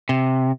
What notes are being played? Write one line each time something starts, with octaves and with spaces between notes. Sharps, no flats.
C3